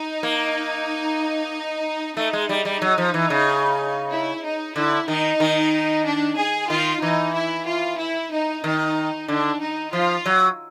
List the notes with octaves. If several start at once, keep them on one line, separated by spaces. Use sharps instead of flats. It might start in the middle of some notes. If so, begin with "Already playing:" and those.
Already playing: D#4
A#3
A3 D#4
G#3
G3
G3
F#3
F3
E3
C#3
E4
D#4
D3 E4
D#3 D#4
D#3
D4
G#4
D#3 F4
E3 D#4
E4
F4
E4
D#4
D#3 D#4
D3 D4
D#4
F3 F4
F#3